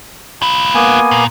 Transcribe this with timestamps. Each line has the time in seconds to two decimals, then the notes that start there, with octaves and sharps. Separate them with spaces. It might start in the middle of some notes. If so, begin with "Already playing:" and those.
0.42 F4 B4
0.75 A#3 B3 G#5
1.11 A#2